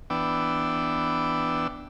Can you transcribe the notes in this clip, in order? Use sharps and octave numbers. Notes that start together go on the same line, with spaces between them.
E3 B3 D4 G5 D6 E6